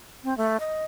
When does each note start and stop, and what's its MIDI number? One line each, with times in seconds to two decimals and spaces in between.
0.24 0.36 60
0.37 0.57 57
0.60 0.84 75